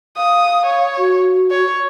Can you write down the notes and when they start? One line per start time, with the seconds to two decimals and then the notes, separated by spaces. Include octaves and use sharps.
0.17 F5 D#6
0.66 C#5
0.98 F#4
1.51 C#5